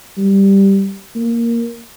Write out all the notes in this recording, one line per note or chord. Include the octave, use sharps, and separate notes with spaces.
G3
A#3